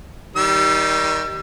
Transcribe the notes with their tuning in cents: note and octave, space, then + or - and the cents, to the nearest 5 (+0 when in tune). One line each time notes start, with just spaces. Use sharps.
D#3 +10 G3 -20 E6 +35